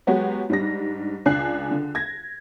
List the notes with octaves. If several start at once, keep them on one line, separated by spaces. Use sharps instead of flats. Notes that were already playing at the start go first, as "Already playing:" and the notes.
F#3 G#3 B3 F#4 G4 C#5
G#2 G3 D4 A#6
C#2 D4 G#5 F#6 C7
D3
G#6 A#6